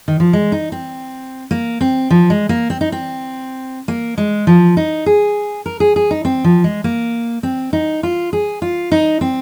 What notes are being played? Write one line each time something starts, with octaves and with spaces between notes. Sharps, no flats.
D#3
F3
G#3
D#4
C4
A#3
C4
F3
G#3
A#3
C4
D#4
C4
A#3
G#3
F3
D#4
G#4
A#4
G#4
G#4
D#4
C4
F3
G#3
A#3
C4
D#4
F4
G#4
F4
D#4
C4